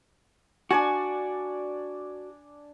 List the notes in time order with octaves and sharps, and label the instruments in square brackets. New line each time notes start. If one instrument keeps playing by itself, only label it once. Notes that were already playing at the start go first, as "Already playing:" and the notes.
[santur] D4 D5 G#5 [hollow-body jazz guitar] F#4